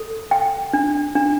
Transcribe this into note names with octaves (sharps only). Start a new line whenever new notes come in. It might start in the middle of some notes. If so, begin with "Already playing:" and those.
Already playing: A4
G5
D4
D4